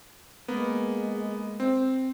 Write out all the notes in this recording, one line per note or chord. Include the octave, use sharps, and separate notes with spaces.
G#3 A#3 B3
C4